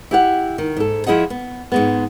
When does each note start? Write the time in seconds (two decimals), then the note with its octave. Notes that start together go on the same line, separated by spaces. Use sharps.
0.11 E4 G4 F#5
0.58 D#3
0.76 G#2 A4
1.07 F3 E4 G#4 D#5 F#5
1.30 B3
1.72 G#2 G#3 B3